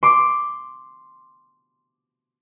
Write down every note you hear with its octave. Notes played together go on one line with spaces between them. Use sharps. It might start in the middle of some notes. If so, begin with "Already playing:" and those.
C6 D6